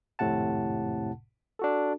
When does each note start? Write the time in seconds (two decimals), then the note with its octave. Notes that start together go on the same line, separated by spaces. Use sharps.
0.19 G#1 F2 A2 C3 F#5 A5
1.59 D4 F#4 A4